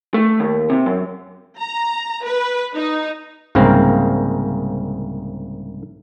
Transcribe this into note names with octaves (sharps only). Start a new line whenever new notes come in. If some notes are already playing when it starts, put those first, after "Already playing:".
A3
D#2
C3
F#2
A#5
B4
D#4
C2 G#2 C#3 A#3 C4 F5